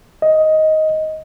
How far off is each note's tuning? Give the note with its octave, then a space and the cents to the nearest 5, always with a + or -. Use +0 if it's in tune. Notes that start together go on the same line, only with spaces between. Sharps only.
D#5 +10